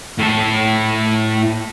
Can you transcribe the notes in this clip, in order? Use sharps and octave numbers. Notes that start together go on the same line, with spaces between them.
A2 A4